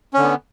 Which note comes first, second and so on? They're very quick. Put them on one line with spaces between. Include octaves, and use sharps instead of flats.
C#4 D3 B3